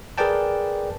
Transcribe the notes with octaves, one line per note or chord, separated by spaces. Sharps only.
G#4 A#4 B4 D5 G5 A5